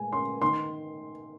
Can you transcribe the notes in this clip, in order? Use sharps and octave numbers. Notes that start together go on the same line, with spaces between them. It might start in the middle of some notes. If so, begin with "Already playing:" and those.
Already playing: A#2 G#3 G#5
C#4 C6
D#3 C6